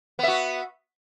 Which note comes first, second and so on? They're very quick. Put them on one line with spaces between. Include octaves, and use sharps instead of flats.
B3 E5 F#4